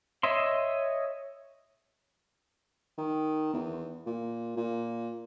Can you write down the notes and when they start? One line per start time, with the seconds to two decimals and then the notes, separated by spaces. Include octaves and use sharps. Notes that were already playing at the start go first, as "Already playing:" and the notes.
0.23 C#5 D#5 E5 C6
2.98 D#3
3.53 E2
4.06 A#2
4.57 A#2